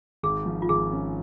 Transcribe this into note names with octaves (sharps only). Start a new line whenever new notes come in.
G#1 G#4
F3
F4
G#1 G#4
C#4